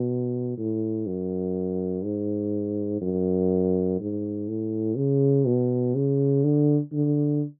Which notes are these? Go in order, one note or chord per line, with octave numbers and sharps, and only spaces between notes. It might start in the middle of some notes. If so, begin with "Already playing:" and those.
Already playing: B2
A2
F#2
G#2
F#2
G#2
A2
C#3
B2
C#3
D3
D3